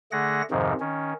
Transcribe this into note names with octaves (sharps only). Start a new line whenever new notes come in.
D3 A3 G#4 F#5 A#6
F2 G#2 C3 D#3 F3
D#3 C#4